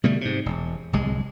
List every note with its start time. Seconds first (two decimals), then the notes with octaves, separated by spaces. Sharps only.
0.04 B2 D3 G3 A3
0.21 G#2 C3
0.46 E1
0.92 D1 C2 G#3